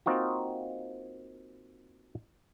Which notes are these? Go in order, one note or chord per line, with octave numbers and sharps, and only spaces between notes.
A#3 C4 D#4 F4 F#4